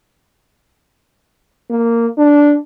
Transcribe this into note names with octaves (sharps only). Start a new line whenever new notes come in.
A#3
D4